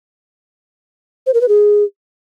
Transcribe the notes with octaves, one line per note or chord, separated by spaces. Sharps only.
C5
A#4
B4
G#4